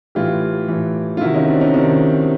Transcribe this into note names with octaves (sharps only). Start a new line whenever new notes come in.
A2 E3 F4 G4
A2 E3
F4
C3 D#3 E4 F#4
C#4 D#4
C4 D4
C#4 D#4
C3 D#3 C4 D4